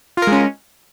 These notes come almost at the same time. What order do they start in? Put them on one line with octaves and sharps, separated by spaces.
F4 A#4 G#3 C#4